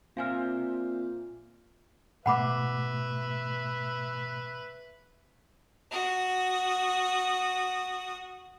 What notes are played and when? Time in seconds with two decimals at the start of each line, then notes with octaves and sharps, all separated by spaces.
0.17 A#2 C4 C5 E5 F5 G#5 F6
2.26 G#2 B2 A3 B4 E5 F#5 B5 D6
5.90 F#4 D#6